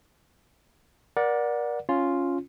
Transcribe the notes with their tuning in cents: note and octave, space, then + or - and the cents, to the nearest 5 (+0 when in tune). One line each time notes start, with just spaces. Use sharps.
A#4 +35 D5 +0 F#5 -15
C#4 +0 F4 +0